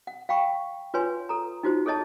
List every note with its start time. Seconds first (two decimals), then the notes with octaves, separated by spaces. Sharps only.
0.07 F#5
0.29 F5 G5 B5 C#6
0.94 F4 B4 C#5 G#5 C6
1.29 A4 A#5
1.63 D#4 F4 F#4 C5
1.86 G#4 A4 C#5 D#5 A5